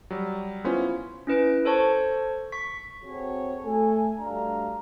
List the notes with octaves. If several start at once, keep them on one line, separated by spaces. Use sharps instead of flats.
F#3 G3
B3 C#4 E4 F4 C5
C#4 E4 B4 D7
A4 C5 C#5 A5 C#6
C#6 B6
C4 F#4 G#4 A4 C#5
A3 A4 G#5
G2 A3 D4 F#4 F5 A#5